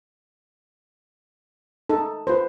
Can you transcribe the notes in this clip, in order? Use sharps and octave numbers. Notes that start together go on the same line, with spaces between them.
D#4 A4
F4 B4 C5